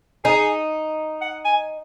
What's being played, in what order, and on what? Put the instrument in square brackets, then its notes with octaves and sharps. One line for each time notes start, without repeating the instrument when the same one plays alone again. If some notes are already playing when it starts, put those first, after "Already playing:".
[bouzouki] D#4 [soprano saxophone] G#4
[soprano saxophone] F#5
G#5